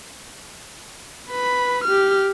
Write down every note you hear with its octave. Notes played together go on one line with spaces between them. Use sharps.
B4 B5
G4 F6